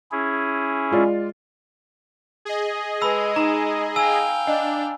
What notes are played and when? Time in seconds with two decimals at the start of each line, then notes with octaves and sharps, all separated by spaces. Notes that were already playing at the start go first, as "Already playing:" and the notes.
0.11 C#4 E4 G#4
0.91 G#3 F4 D5
2.45 G#4 D#5
3.02 G#3 B4 A5 B5 E6
3.36 D#4 A#5
3.96 F5 G5 G#5 E6
4.47 D4 D#5